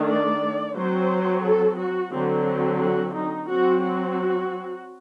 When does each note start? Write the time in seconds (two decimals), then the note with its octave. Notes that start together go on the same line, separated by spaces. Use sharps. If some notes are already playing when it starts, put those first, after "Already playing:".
Already playing: D#3 A3 D4
0.08 D5
0.76 F#3 C4 C5
1.45 A4
1.79 F#4
2.13 D3 F#3 C4
2.82 F#4
3.15 D#4
3.49 F#3 C4 F#4
3.84 F#4